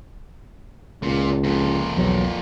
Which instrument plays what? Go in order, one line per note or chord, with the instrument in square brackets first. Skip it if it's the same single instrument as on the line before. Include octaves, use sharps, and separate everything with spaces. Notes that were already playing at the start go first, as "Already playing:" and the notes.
[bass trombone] C#2 [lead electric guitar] A#2
[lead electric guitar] F2 A#2
[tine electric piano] B1 E2 F#3